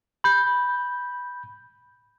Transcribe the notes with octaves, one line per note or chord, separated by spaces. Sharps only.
B5 G6